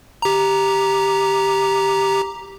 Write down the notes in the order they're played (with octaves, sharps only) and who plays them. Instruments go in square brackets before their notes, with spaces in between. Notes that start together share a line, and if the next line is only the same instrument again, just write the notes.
[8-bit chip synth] G4 A#5